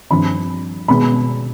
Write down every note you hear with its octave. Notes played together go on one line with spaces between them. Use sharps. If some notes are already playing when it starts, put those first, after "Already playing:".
G2 F3 C4 B5
B2 G#3 B3 B5